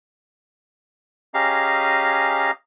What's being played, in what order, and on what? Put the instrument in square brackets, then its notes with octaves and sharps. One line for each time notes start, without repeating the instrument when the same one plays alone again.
[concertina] C#4 G4 G#4 D#5 F5 A#5